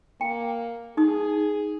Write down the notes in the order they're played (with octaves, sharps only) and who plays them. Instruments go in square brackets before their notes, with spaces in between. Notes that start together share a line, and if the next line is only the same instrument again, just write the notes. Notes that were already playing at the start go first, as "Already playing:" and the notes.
[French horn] A#3 [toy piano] G5
[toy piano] D#4 D#6 [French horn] G#4